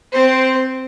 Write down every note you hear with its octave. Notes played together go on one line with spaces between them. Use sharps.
C4 C5